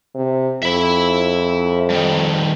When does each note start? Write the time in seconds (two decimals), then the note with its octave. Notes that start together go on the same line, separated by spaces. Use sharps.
0.15 C3
0.63 F2 E5 B5
1.90 G2 D#3